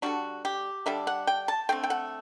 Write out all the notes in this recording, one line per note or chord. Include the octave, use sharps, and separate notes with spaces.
D3 G3 D4 F#4
G4
D3 G3 D4 E5
F#5
G5
A5
D3 A3 C4 G5
G5
F#5